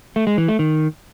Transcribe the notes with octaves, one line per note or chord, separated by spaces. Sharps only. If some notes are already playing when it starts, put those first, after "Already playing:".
A3
G#3
E3
A3
D#3